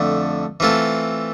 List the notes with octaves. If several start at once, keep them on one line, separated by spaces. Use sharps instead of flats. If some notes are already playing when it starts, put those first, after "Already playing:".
Already playing: F2 D3 A3
E3 A3 C4 F4 A4